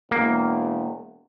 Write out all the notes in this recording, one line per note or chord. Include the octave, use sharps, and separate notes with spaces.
E1 A#3